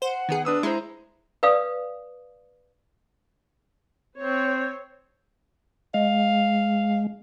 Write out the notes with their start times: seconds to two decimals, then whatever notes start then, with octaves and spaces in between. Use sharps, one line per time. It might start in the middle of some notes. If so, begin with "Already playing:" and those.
0.02 C5 F#5
0.29 D#3 B3 G#4
0.45 D4 B4 D#6 E6
0.63 G#3 E4 C5 A#5
1.43 B4 D5 F5 D#6
4.18 C4 C5 C#5
5.94 G#3 F5